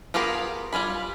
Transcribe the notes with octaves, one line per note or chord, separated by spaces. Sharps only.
B3 F4 G4 G#4 A#4
G3 F4 G#5 B5